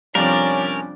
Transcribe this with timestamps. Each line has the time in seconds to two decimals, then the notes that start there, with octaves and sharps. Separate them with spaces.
0.15 F2 C3 F3 G3 C#4 D4 A#4 D5